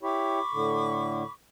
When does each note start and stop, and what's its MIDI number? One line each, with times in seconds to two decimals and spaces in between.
0.03 0.39 64
0.03 0.39 67
0.03 0.39 73
0.03 1.30 83
0.03 1.30 85
0.03 1.30 86
0.53 1.23 45
0.53 1.23 50